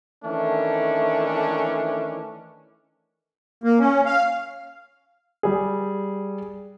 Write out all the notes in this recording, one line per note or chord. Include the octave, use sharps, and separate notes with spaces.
D#3 E3 A3 C#4 D4
A#3
C#4
F5
G3 G#4